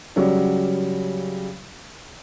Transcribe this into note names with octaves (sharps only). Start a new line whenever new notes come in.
C#3 F#3 G3